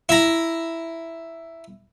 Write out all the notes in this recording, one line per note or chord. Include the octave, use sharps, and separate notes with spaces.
E4 A#5